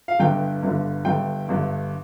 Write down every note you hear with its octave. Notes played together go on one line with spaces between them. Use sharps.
F5
G1 G2 D3 G5
G1 G2 D3
G1 G2 D3 G5
G1 G2 D3